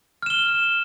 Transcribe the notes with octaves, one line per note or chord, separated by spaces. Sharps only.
F6 E7 G7